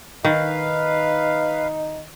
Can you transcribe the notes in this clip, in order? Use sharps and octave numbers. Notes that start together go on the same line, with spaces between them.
D#3 D#4 B4 F5